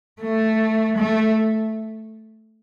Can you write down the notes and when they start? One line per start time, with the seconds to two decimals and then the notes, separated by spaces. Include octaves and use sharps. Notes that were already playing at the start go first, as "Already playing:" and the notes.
0.22 A3
0.97 A3